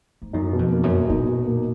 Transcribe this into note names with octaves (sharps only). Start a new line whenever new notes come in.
G#2
F#2 D#4
B2
F2
A#3
F#2
B2
A#2 D#4
B2
A#3